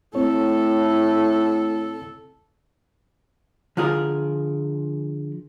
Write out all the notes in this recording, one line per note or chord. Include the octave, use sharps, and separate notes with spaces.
A2 A3 C4 A4 C#5
D3 F3 F4 G#4 A#4